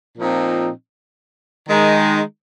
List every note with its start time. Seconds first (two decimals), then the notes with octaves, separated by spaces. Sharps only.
0.16 A#2 F3 C4 D#4
1.68 D#3 G#3 D#4